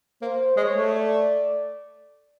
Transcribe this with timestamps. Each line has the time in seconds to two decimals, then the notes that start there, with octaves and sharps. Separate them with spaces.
0.22 A#3 C5
0.57 G#3 C#5
0.74 A3
0.91 D5